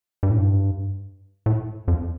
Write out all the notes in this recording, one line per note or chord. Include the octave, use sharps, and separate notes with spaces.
G2
A2
G2
A2
F2